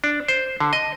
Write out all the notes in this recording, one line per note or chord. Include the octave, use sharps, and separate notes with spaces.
D4
C5
D3
D#5